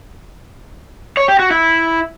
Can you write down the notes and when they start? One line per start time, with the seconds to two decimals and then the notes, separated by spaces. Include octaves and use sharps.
1.17 C#5
1.28 G4
1.39 F#4
1.51 E4